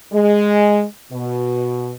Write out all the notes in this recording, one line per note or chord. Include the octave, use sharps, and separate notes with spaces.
G#3
B2